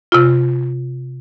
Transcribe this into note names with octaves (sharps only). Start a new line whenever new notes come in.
C3 F4